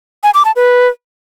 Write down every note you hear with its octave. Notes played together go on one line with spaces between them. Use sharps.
G#5
D6
A5
B4